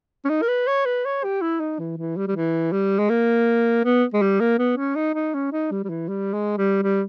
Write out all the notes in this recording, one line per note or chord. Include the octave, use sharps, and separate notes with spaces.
C#4
D#4
A#4
B4
C#5
B4
C#5
G4
E4
D#4
E3
E3
G3
G3
E3
G3
G#3
A#3
B3
G#3
G3
A#3
B3
C#4
D#4
D#4
C#4
D#4
G3
G3
E3
G3
G#3
G3
G3